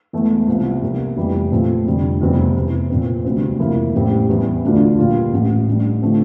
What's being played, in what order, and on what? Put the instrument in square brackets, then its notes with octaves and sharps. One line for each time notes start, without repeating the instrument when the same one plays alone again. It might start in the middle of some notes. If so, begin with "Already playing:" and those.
[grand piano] E1 E2 E3 A3
C2 C3 F3 C4
C2 C3 G3 A#3
F1 F2 E3 G3
A#2 F3 A3 C4
F1 F2 D3 G3 D4
F1 E2 C3 G3 C4
F1 E2 E3
A#2 F3 C4
E1 D2 C3 G3 C4
F1 F2 E3 A#3 E4
A1 A2 G3 C4 G4
E2 E3 G3
D2 D3 A3 D4 F4
A#2 G3 A#3 F4
A1 A2 F3
A2 G3 D4
D3 F3 A3 C4